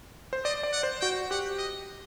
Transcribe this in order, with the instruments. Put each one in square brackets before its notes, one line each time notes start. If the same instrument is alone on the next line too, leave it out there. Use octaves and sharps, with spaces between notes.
[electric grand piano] C5
[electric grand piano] D5 [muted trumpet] D#5
[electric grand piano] D5
[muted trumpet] F#5
[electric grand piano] C5
[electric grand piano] F#4 [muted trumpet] G5
[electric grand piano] G4 [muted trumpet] F#5
[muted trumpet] D#5